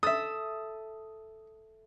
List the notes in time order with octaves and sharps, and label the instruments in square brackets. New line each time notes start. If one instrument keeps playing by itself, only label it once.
[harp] A4 E5 [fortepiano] D#6